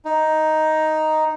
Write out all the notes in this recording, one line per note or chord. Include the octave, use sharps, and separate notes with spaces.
D#4